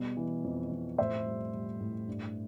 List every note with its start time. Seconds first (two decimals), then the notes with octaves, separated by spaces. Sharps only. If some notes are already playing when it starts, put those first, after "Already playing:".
Already playing: B2 G3
0.17 E3
0.44 F2
0.71 F2
0.98 A2 C5 E5
1.26 G3
1.54 G3
1.80 A2
2.08 G2